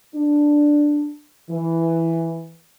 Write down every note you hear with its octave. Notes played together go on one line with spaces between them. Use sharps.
D4
E3